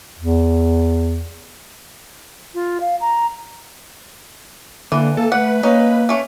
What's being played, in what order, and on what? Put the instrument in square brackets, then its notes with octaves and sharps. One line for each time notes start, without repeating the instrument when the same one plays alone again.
[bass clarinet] E2
[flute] F4
F5
A#5
[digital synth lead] D3 [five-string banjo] E3 [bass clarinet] A#3
[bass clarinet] A#3 [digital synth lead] A4
[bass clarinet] A3 [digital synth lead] B4 [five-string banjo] F#5
[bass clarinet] A#3 [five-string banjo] C#4 D#4
[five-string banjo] A3 C#4